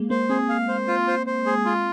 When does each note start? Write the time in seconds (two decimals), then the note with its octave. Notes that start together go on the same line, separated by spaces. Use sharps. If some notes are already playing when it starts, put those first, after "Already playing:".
Already playing: G#3 A#3
0.10 A#3 C5
0.29 C4 G#4
0.49 F5
0.68 C5
0.88 F4
1.07 C5
1.27 C5
1.46 G#4
1.65 F4